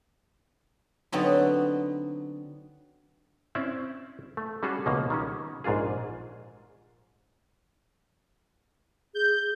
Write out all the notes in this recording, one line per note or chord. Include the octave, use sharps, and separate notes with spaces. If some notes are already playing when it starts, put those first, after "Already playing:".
D3 F#3 B3 C4 D#4
C4 C#4 E4 D5 E5
A3
G3 C#4 F#4 G#4 A4
C#2 B2 F3 A#3
D#3 G3 C#4
A#1 G#2 D4 F4 G#4
G#4 G6